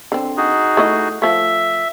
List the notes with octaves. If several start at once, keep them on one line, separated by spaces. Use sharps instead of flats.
D3 C4
D#4 F#4 G#4
A3 E4 D#5
F3 A3 E5